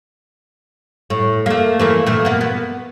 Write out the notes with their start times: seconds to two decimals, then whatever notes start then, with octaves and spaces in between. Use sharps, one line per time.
1.10 A2
1.46 A3 A#3
1.79 E3 A3 A#3
2.06 A#2 A3
2.25 A#3 B3
2.41 B3